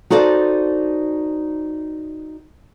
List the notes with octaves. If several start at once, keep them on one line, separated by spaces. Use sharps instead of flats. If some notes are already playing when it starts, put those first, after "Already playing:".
D#4 F#4 A4 C5 D5